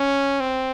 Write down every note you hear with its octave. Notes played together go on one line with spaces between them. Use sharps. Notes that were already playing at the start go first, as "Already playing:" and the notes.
Already playing: C#4
C4